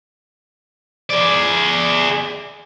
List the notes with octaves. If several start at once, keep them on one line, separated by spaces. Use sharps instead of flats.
G#4 D5